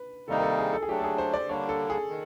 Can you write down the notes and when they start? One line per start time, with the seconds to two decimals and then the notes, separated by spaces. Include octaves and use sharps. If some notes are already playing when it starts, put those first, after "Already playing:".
Already playing: B4
0.28 C3 D#3 G3 A#3 D#4 A4
0.38 A#4
0.42 A4
0.59 G#4
0.73 A4
0.82 G#4
0.88 F#3 A3 D4 G4
0.99 A4
1.04 G#4
1.18 C5
1.33 D5
1.49 D3 G3 A#3 D4 C#5
1.69 A4
1.90 G#4
2.09 D#3